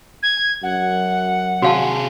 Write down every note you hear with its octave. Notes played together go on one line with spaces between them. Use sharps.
G#6
F#2 F#5
C3 F#4 G#4 F5 A5